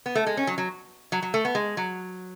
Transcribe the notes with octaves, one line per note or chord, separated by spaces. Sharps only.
B3
A3
G#3
C#4
F#3
F#3
F#3
F#3
A3
B3
G#3
F#3